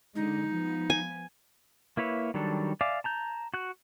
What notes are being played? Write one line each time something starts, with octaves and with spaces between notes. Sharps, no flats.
D3 G#3 D#4
F3 B3
G#5
A#3 E4 B4 C#5 E5
D#3 F#3 G3 D4 A4
D5 E5 F5 G#5 D6
A5 A#5 G6
F#4 F#6